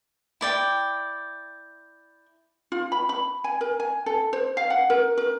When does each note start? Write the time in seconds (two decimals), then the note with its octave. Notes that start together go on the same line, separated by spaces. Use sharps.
0.41 E4 D5 G5
2.72 F4
2.92 B5
3.09 B5
3.44 G#5
3.61 A#4
3.80 G#5
4.06 A4
4.33 C5
4.57 F5
4.70 F#5
4.90 A#4
5.18 A#4